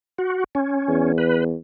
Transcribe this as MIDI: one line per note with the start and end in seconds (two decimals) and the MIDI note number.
0.18 0.44 66
0.55 1.12 61
0.89 1.54 40
1.18 1.44 71